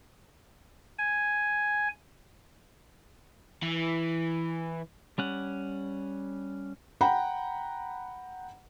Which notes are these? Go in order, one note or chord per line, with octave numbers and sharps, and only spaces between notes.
G#5
E3
G3 C#4 F#5
F#5 G5 A#5 B5